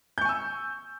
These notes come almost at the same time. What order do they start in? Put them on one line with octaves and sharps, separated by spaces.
G6 C#6 G#5 E6